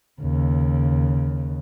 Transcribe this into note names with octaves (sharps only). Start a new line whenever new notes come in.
D#2 C#3